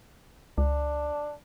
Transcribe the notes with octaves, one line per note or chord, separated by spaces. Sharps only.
C#2 D4